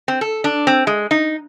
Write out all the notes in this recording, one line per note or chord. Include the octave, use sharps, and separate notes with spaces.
C4
A4
D4
C4
G#3
D#4